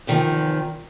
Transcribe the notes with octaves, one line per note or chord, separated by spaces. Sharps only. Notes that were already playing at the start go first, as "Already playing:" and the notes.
E2 C3 D#3 F3